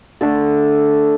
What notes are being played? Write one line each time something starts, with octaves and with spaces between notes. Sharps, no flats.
D3 A3 A4